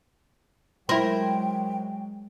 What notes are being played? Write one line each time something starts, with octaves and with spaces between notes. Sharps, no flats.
F#3 G#3 E4 A#4 C5 G5